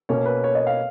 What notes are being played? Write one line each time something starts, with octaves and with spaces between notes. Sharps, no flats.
B2 A#3 C#4 C#5
B4
C#5
D#5
F5